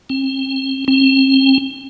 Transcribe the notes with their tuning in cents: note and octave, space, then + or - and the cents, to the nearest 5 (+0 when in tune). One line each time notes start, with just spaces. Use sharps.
C4 +40
C4 +40